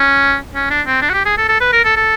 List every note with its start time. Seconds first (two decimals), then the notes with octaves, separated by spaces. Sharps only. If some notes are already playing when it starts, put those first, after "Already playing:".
Already playing: C#4
0.55 C#4
0.70 D4
0.87 C4
1.02 D4
1.10 F#4
1.13 G4
1.25 G#4
1.38 A4
1.48 A4
1.60 B4
1.73 A#4
1.85 A4
1.96 A4